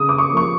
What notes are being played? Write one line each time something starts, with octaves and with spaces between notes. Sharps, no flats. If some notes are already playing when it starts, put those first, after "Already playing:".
Already playing: C#3 D#6
D6
C#6
F3 A#3 C#6